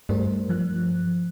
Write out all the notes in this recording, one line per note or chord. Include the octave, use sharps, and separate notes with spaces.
G2 A3 A#4 C5
F3 F#6